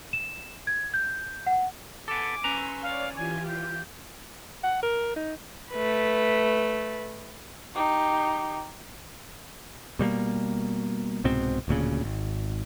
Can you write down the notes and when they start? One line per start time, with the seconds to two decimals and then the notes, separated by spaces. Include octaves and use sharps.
0.13 E7
0.67 G#6
0.94 G6
1.47 F#5
2.08 B3 A4 G#5 D6
2.44 C#4 B4 A#5 C6 C#6 E6
2.83 C#5 D5 F5
3.16 E3 F4 G4 G#5
3.48 G6
4.63 F#5
4.83 A#4
5.16 D#4
5.71 A3 B4
7.75 D#4 G4
9.99 B2 G3 G#3 A#3
11.24 C2 G#2 B2 C4
11.68 D1 D2 A#2 C#3
12.04 G#1